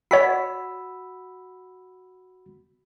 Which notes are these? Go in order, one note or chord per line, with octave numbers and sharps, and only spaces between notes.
F#4 C#5 F#5 B5 E6 B6